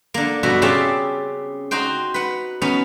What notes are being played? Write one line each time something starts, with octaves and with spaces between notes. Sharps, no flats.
D3 A#3
G2 B2 F#4 E5
C#3 C4 C#4 G4 A5
D#4 F#4 C5 G5
B4 F#5
B3 C#4 D#4